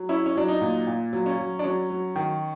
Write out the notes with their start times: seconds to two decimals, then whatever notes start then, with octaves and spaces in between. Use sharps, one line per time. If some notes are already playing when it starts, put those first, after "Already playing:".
Already playing: F#3
0.09 C#4 E4
0.26 C#4
0.36 F#3 D4
0.48 D#4
0.61 A#2
0.87 A#2
1.13 F#3
1.26 C#4
1.38 F#3
1.59 D4
1.64 F#3 C#4
1.90 F#3
2.16 D#3